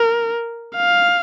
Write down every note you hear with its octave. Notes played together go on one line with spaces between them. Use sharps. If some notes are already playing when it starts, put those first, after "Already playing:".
Already playing: A#4
F5